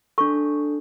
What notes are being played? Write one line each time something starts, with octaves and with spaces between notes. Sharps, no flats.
D4 A4 C#6